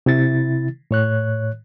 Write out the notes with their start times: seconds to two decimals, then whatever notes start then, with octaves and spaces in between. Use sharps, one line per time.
0.06 C3 E4 A6
0.91 A2 C#5 F#6